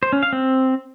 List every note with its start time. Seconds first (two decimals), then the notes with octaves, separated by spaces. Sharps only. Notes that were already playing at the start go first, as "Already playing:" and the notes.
0.03 C5
0.13 C#4
0.23 F5
0.33 C4